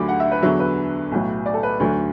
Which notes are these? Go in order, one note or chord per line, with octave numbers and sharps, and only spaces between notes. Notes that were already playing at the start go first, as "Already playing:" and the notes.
Already playing: D2 D3 F#3 B5 D6
F#5
E5
B4
E2 D3 F#3 E5
B4
B1 A2 F#3
D5
A4
B4
D2 D3 F#3